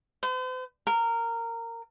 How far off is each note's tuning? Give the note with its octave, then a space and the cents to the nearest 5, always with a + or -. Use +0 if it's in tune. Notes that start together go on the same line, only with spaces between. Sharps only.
C5 -45
A#4 -15